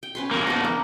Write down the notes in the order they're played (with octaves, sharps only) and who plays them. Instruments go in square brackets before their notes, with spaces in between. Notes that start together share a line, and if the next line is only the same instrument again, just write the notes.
[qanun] G5
C#4 B4 C6
[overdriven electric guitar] F2 A#3
[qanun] B3 D4
A#3